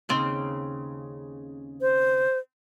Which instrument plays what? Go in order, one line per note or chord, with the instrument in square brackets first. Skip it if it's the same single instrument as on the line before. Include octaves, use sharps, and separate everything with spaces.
[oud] D#2 C#3 C4
[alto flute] C5